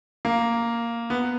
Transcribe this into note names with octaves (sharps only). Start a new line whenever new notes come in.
A#3
B3